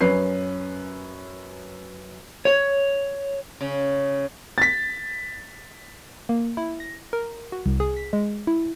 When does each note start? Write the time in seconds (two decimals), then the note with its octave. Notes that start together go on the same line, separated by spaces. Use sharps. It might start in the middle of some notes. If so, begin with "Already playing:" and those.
0.01 F#2 C#4 B4 C7
2.45 C#5
3.61 C#3
4.58 A6 B6
6.29 A#3
6.57 E4
6.80 A#6
7.13 A#4
7.52 F#4
7.66 C2
7.80 G#4
7.97 B6
8.13 G#3
8.47 E4